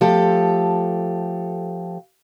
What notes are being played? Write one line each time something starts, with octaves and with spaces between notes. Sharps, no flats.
F3 A3 G4 A4